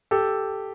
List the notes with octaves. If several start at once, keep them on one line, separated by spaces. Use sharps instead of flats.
G4 A4